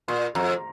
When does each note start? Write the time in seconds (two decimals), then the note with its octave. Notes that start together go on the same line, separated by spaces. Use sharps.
0.08 A#2 C6
0.35 F2 A#5